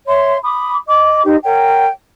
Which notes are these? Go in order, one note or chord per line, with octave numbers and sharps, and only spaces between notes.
C#5 E5 C6
B5 D6 D#6
D#5 D6
D#4 G4 C5
A#4 C#5 F#5 G5